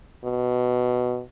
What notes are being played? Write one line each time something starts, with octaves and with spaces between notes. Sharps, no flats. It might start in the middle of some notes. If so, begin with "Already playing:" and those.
B2